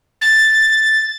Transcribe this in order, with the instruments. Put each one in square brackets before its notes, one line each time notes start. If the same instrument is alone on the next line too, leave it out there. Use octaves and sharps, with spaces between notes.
[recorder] A6